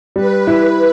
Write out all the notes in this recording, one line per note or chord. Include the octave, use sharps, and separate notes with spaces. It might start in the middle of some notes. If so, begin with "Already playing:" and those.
G3 B4
E4